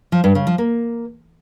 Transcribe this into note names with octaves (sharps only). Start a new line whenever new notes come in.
F3
G2
C#3
F3
A#3